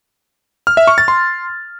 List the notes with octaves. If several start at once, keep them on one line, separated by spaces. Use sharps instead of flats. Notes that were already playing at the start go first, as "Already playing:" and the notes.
F6
E5
C#6
A6
C6